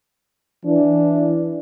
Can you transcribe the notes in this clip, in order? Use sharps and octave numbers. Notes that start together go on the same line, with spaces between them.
E3 D4